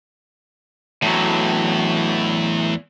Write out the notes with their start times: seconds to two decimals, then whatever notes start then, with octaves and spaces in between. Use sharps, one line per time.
1.02 E2 A2 F#3